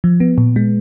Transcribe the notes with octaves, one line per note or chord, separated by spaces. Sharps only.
F3
B3
A#2
G#3